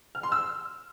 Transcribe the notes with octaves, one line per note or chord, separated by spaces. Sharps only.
F6
C6
E6